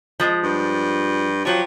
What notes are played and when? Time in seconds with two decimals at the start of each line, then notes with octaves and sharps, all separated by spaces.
0.20 F3 G#3
0.43 G2
1.45 F3 F#3 G4